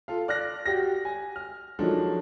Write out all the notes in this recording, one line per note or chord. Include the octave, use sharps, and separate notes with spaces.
F4 A4 F5
D5 F6 F#6 A#6
F#4 G4 A#6
G#5
F6
D#3 F3 F#3 G#3 D4 A4